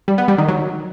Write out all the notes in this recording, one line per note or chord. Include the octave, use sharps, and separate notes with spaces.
G3
B3
G3
D#3
F#3